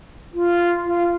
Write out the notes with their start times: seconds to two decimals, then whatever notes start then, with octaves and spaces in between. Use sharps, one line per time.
0.33 F4
0.85 F4